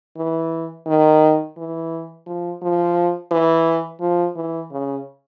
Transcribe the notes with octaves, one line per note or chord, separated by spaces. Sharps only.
E3
D#3
E3
F3
F3
E3
F3
E3
C#3